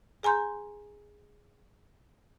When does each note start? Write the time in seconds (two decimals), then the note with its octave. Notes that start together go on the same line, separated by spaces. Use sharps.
0.23 G#4 G#5 A#5 C6 G6